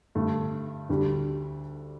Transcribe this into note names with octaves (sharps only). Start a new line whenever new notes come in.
G2 D3 A3
D2 D3 G3